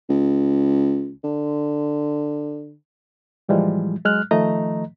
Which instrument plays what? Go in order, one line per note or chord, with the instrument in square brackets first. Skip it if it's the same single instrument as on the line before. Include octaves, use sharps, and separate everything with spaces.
[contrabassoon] C#2
D3
[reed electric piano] A2 E3 F3 G3 G#3
F#3 G#3 F6 F#6
D#3 F3 A3 D#5 A#5